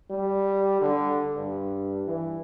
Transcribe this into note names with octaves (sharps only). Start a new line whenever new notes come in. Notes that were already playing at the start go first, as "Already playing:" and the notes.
G3
D3
G2
E3